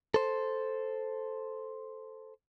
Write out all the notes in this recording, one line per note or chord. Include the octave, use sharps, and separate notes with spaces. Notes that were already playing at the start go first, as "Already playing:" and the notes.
A4 C5